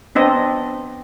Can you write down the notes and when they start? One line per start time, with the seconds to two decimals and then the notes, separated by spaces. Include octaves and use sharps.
0.15 B3 C4 D4 D#5